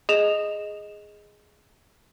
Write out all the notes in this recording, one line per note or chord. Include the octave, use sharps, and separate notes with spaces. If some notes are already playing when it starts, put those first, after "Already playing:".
G#4 D#5 E7 F7